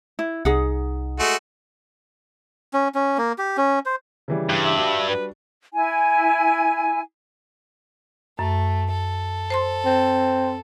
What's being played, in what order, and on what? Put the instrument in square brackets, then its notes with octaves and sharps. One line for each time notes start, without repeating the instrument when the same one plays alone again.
[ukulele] E4
[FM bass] C2 [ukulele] D#4 G#4 F#5
[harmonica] G#3 A3 F#4
[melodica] C#4
C#4
A#3
G4
C#4
C5
[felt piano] C#3 E3 G3
[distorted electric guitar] G2
[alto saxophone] E5
[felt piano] G3 D4 F#4
[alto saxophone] B4
[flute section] E4 G#5
[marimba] F#2 [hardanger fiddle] A3
[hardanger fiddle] A4
[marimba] C5 A5 C6
[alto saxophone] C4